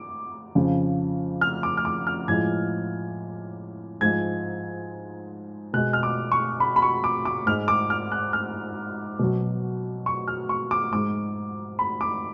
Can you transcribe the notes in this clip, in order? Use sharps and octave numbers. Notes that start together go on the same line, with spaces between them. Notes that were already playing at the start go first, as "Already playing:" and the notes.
Already playing: D6
F2 C#3 F3
F6
D6
F6
D6
F6
A2 F3 G#3 G#6
G#2 F3 G#3 G#6
B2 G#3 F#6
F6
D6
C#6
B5
B5
C#6
D6
D6
G#2 G#3 F6
D6
F6
F#6
F6
B2 F#3
C#6
F6
C#6
D6
G#2 G#3 D6
B5
D6